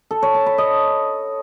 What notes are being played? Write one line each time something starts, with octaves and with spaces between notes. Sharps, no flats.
A4
C#5
A5
B5
D#5